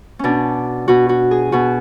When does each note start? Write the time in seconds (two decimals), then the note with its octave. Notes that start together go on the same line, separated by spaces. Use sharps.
0.19 B2 C#4 D4
0.88 B2 F#4
1.09 F#4
1.31 G#4
1.52 B2 F#4